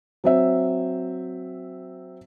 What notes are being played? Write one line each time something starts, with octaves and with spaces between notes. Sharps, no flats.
F#3 C4 E5